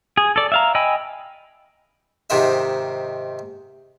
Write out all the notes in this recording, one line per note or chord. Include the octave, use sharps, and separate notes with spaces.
G#4
A4 D5
E5 F5 A#5
D#5 G5 G#5 B5 E6
G#2 C3 D#3 F4 E5